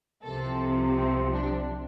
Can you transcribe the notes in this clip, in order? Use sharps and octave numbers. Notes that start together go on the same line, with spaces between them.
C2 C3 F3 A4
C4
D4